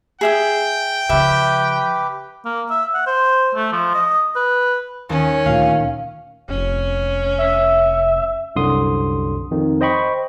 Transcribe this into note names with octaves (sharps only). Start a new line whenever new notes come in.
G#4 E5 G5 D#6
C#3 F3 G4 B4 E5
A#3
E5
F#5
C5
A3
F3
D#5
B4
D#2 C#4
D2 A#2 F5
F1 C#4
E5
C2 F#2 D3 C6 D#6
F2 D#3
C5 D#5 G5 B5 C#6